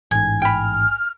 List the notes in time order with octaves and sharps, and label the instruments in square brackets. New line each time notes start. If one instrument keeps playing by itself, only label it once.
[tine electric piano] A1 G#2 [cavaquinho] G#5
[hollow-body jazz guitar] G5 B5 [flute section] F6